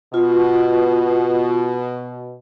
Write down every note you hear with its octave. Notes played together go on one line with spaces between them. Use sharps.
B2 F4